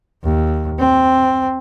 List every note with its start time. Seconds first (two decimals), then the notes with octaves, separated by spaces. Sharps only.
0.24 D#2
0.79 C4